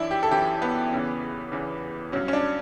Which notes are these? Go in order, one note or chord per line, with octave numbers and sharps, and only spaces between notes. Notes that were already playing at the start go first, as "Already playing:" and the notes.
Already playing: F#2 E3 D4 E4
G4
A4
F#2 E3 G4
B3
E2 C#3 E3
E2 C#3 E3
G2 F#3 C#4
C#4
D4